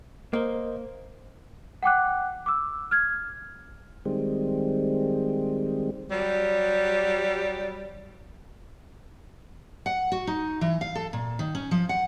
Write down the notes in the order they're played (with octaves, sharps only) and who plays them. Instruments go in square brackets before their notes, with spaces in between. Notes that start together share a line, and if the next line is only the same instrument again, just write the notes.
[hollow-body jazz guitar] A#3 [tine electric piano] A#4 C5 D#5
[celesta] F#5 G5 D6 F#6
D6 E6
F6 G#6
[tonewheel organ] D#3 G3 G#3 C4
[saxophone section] F#3 G3
[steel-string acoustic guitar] F#5
F#4
D#4
E3
F5
A4
A#2
D#3
C#4
F3
F#5